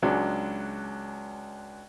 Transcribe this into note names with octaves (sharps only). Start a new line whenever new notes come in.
C#2 F#3 G#3 D4 G#5